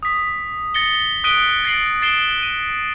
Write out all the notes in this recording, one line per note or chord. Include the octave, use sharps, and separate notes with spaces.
D#6 B6
A6 A#6 C#7 G7
D#6 F#6 B6 D7 D#7 G7
A6 A#6 C7 D7 F#7
A6 C7 D7 E7 G7
D#7